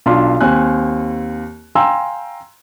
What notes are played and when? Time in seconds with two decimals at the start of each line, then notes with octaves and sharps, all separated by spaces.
0.06 B1 D4 F4 C6
0.41 D#2 C4 G#5 F#6
1.75 F5 G5 G#5 A#5 C6 E6